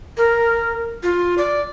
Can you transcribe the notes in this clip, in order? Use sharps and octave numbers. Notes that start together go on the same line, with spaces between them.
A#4
F4
D5